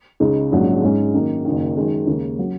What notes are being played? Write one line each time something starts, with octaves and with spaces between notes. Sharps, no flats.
C#2 C#3 G#3 D#4
A#1 G#2 F#3 C#4
G#2 G#3 C#4
F#2 D#3 A#3 D#4
F#1 F#2 D#3
F#2 D#3 G#3
D#2 C#3 A#3
F#3 C#4